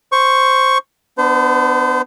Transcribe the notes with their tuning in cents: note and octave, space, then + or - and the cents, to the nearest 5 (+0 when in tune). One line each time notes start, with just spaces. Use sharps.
C5 +0 C#6 +0
B3 +15 D4 +20 C5 -35